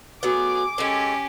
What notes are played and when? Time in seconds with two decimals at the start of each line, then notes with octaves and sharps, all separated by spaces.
0.23 F#3 A3 B3 G#4 D6
0.78 G#3 C#4 G4 A4